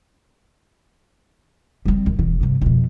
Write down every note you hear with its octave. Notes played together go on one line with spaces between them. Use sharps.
G3 C4
D#2
E1 E3
G2 C3
F2 B2